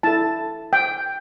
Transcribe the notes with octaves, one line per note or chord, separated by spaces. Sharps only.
E4 A4 A5
G5